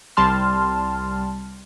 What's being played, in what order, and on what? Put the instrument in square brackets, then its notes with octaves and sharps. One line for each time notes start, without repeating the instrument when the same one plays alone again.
[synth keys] C2 G3 A5 C6 F6